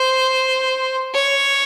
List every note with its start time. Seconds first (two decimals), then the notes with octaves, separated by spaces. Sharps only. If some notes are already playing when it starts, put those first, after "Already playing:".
Already playing: C5
1.14 C#5